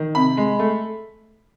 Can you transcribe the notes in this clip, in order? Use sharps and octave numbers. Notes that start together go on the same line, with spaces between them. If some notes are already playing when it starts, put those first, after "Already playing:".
Already playing: D#3
C3 B5
G#3
A3